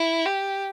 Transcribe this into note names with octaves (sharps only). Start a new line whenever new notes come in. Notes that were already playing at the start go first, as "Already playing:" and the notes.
Already playing: E4
G4